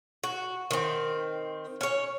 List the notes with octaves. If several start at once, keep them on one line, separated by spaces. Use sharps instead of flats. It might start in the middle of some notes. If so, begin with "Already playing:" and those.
F#4
D#3 C4
C#4 C#5